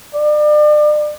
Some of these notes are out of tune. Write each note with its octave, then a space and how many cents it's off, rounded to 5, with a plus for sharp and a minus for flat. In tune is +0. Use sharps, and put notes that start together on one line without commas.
D5 +35